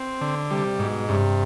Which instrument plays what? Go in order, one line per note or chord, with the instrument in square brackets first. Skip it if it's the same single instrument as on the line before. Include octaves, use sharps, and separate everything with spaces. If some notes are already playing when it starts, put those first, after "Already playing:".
Already playing: [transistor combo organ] C4
D3
[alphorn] C3 [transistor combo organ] G3
[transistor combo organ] G#2 [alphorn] B2
[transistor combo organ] G2 [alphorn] C3